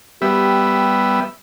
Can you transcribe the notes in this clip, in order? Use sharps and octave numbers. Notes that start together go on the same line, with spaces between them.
G3 B3 G4 E5